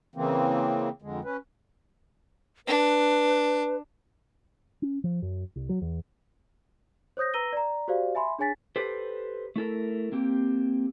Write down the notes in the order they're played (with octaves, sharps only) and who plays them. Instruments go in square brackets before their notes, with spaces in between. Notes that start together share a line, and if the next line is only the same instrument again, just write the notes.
[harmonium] C#3 E3 A#3 C4
F2 D3 G#3
C#4 B4
[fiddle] D4 [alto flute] B4
[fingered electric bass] C#4
F3
F#2
C2
F#3
E2
[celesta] C5 C#5 D#6 G6 A#6
B4 A#5 E6 A#6 D#7 G7
D5 A#5
F#4 G4 C5 D5 F5
E5 G#5 B5 C6
D4 G#4 C#5 G#5 A6 B6
[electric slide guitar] G4 A4 B4 C5
A3 E4 A4 A#4
A#3 C4 G4